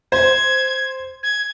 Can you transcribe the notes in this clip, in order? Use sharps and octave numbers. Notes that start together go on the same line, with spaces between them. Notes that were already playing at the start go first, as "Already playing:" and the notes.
C5 G#6
G#6